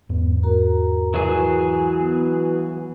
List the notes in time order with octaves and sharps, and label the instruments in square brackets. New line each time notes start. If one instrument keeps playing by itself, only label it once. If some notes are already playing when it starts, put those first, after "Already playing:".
[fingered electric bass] E2 G#2 B3
[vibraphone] F#4 A#4 A#5
[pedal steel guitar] E3 F#3 G#4
[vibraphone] B3